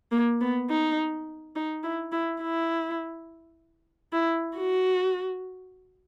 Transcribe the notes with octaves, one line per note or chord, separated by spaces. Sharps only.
A#3
B3
D#4
D#4
E4
E4
E4
E4
F#4